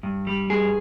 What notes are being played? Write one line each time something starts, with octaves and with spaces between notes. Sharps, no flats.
G2
G3
G2 G#4